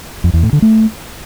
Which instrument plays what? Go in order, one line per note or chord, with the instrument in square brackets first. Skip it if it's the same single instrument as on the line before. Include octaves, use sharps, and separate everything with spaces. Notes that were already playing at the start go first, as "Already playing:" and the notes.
[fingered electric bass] F2
E2
A2
D3
A3